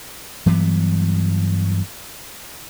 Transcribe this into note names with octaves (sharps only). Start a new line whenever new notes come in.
G2 E3 F#3 B3